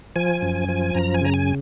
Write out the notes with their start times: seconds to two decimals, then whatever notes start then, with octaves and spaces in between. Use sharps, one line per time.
0.16 F3 G#5
0.42 F#2
0.69 F3
0.95 F#2 A#5
1.14 G#5
1.21 C#3 A#5
1.34 G#5